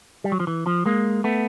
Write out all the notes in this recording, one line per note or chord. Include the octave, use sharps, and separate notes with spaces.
G3
F#3
F3
E3
F3
G#3 A#3
A3 B3